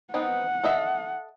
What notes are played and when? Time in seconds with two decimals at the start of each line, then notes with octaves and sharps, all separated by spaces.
0.14 B3 C4 D#4 F#5
0.64 A4 D#5 E5